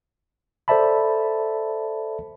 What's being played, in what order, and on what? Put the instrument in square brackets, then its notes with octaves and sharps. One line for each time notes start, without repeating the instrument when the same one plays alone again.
[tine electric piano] A4 C5 D5 E5 A5 B5